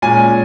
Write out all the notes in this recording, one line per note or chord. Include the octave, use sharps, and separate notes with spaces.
A#2 G#3 C#4 G#5